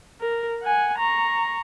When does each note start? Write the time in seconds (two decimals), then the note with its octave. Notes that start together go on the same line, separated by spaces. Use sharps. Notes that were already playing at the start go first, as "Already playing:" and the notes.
0.21 A#4
0.63 F#5 G#5
0.98 A#5 C#6